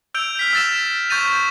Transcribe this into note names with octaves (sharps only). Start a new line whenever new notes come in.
E6 G6 D7 F7
F6 B6 F7
E6 A6 E7
C#6 G6 A6 D#7 F7